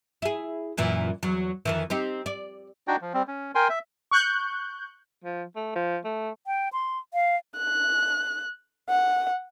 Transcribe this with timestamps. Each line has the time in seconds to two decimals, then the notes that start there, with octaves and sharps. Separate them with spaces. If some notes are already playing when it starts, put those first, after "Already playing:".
0.22 E4 G#4
0.78 F#2 A#2 E3
1.23 E2 F#3
1.65 F2 D#3 E3
1.90 C4 D#4 G4
2.26 D5
2.88 D4 D#4 F#4 G5
3.01 F3
3.14 G3 C4
3.28 C#4
3.55 A#4 G5 G#5 C6
3.69 E5
4.11 C#6 F#6 G6
5.24 F3
5.56 A3
5.76 F3
6.05 A3
6.46 G5
6.73 C6
7.14 F5
7.57 F#6
8.89 F#5